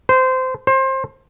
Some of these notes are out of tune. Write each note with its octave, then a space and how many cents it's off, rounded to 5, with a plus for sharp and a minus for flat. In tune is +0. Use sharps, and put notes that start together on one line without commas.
C5 -20
C5 +25